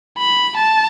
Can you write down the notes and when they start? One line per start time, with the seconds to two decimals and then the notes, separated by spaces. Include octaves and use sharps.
0.18 B5
0.57 A5